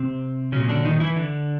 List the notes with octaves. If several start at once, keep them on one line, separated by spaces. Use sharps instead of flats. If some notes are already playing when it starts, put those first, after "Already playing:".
Already playing: C3 C4
A#2 C#3 F#3 C#4
D3 D4
D#3 D#4
E3 E4
D3 D4